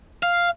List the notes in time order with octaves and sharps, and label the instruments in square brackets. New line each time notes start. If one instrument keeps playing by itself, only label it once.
[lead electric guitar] F5